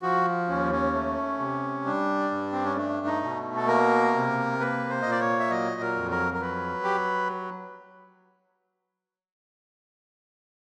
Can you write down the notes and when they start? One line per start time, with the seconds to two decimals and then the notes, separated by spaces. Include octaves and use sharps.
0.02 F3 F#4
0.48 D#2 C#4
0.72 C#4
0.94 A3
1.39 C3
1.86 G3 D4
2.31 G2
2.52 C4
2.65 C#4
2.76 A3 D4
3.06 D#4
3.23 B2
3.57 A4
3.67 A#3 A#4
4.14 C3
4.60 A#3 B4
4.90 C5
5.02 A#2 D#5
5.11 D5
5.21 C#5
5.39 E5
5.50 F#3 D#5
5.81 A#4
5.96 F2
6.11 A#4
6.34 A#4
6.41 F#3 B4
6.84 G4